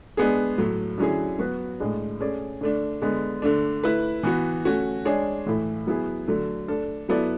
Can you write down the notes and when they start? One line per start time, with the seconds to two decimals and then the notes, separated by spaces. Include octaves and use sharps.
0.17 G#3 B3 D4 G#4
0.58 A2 F#3 A3
0.98 D3 F#3 C#4 E4 G#4
1.39 F#3 B3 F#4 B4
1.80 A2 G#3 D4
2.20 A3 C#4 G#4 D5
2.61 D3 A3 D4
3.02 D3 G#3 B3
3.42 D3 A3 D4
3.83 A3 E4 B4
4.23 E3 B3 F#4
4.65 A3 C#4 F#4
5.05 G#3 D4 G#4 C#5
5.46 A2 E3 A3 E4
5.87 F#3 B3 E4 G#4
6.28 D3 F#3 A3
6.68 A3 D4 A4
7.09 F#3 B3 E4 A4 D5